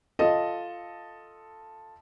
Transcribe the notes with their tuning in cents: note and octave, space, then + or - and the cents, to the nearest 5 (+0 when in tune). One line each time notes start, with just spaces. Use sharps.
F4 +0 A4 +0 D#5 +0